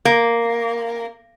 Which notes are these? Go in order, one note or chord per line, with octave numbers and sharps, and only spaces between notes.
A#3